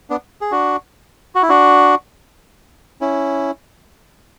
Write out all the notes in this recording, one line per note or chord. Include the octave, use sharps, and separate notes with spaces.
B3 D4
G#4
D4 F#4
F#4
E4
D4 F#4
C#4 E4